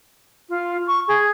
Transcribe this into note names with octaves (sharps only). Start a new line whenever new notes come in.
F4
C#6
G#4